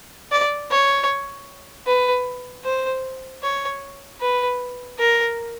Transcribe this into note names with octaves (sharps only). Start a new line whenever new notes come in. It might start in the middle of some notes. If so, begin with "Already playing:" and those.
D5
C#5
B4
C5
C#5
B4
A#4